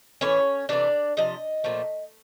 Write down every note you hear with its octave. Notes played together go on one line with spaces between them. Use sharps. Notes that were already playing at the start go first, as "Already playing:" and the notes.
A2 E3 A3 C#4 C#5
C3 E3 A3 D4 D5
C3 F3 D#5
A#2 F3 A3